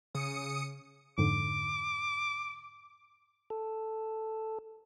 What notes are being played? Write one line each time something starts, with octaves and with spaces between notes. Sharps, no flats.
C#3 D#6 C#7
F2 G#2 D3 D6
A4